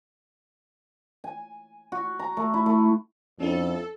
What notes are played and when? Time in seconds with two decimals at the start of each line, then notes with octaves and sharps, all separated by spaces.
1.24 G#5
1.92 F#4
2.19 A#5
2.37 A3
2.54 E4
2.66 A3
3.40 F2 C#4 D4 E4 A4